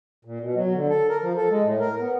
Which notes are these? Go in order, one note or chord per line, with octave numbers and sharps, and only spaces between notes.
A#2
B2
F#3
D3
A4
A#4
F3
A4
G#3
A2
A#4
B3